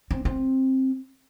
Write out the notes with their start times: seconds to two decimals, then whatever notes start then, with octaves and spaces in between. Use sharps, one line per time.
0.11 C4
0.25 C4